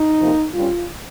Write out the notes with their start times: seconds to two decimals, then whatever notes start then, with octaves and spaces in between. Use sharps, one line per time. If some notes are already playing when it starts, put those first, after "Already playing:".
Already playing: D#4
0.19 F2 C3 F3 A#3
0.54 G2 G3 C#4 F4